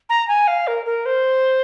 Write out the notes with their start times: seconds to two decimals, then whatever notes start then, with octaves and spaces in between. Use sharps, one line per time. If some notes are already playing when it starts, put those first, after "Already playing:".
0.09 A#5
0.28 G#5
0.47 F5
0.67 A#4
0.86 A#4
1.06 C5